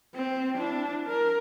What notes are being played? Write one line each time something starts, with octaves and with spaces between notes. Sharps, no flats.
C4
D4 E4
A#4